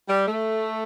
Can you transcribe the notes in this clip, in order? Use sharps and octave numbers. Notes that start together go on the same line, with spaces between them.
G3
A3